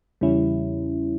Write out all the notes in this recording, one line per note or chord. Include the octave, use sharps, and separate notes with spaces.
E2 C#3 G3 C#4 E4